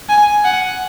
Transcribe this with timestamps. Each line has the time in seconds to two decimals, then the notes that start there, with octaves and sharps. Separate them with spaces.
0.09 G#5
0.45 F#5